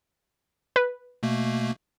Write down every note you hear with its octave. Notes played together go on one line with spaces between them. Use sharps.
B4
B2 A3 A#3